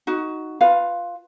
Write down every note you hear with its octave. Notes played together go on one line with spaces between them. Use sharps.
D#4 F#4
F4 B4 F5